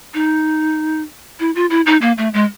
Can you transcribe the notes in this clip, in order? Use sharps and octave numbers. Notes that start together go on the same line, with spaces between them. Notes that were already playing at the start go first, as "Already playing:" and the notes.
D#4
E4
F4
E4
D#4
A#3
A3
G#3